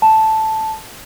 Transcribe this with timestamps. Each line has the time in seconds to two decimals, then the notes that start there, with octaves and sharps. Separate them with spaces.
0.02 A5